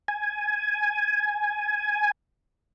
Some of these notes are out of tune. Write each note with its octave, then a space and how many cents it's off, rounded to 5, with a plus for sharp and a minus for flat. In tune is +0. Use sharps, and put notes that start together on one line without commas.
G#5 +10